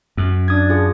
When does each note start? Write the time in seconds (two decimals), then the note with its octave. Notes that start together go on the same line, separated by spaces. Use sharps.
0.17 F#2
0.48 D4 D#6 G#6
0.69 F4 G#4